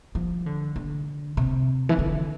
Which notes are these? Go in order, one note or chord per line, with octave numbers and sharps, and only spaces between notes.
F3
D3
D3
C3
E3
D3